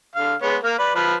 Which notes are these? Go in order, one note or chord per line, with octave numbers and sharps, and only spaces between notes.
D3 F5
G#3 B3 C#5
A#3 A#4
B4 D5
F3 B4